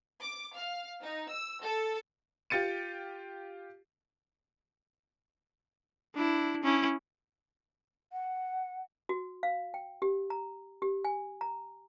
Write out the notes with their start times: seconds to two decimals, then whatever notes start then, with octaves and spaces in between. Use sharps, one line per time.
0.21 D6
0.56 F5
1.01 D#4
1.30 E6
1.64 A4
2.50 F4 G4 A6 C#7 D#7
6.15 D4 E4
6.63 C#4 E4
8.12 F#5
9.09 F#4
9.43 F5
9.74 G5
10.02 G4
10.30 A#5
10.82 G4
11.05 G#5
11.41 A#5